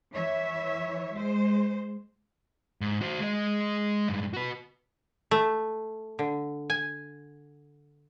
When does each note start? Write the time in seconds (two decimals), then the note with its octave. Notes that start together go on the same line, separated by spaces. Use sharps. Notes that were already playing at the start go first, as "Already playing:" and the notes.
0.13 E3 C#5 E5
1.14 G#3 C5
2.81 G#2
3.01 F#4 C5
3.20 G#3 D#5
4.09 G2 G#3
4.33 F#4 B4
5.31 A3
6.19 D3
6.70 G#5